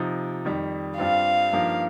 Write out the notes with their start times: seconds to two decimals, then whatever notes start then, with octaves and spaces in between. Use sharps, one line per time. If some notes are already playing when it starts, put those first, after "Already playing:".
Already playing: C3 F3 D#4
0.45 F2 D#3 G3
0.98 G2 G3 C4 F4 F5
1.53 G2 F3 A#3 D#4